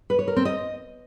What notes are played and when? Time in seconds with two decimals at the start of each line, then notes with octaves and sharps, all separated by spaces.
0.10 B4
0.19 C#5
0.28 A#4
0.36 C4
0.45 D#5